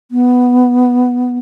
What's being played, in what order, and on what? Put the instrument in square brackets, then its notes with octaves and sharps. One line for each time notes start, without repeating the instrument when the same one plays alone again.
[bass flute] B3